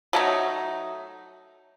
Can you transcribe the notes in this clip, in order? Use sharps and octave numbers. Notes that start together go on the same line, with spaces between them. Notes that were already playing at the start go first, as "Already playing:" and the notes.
F#3 A3 D#4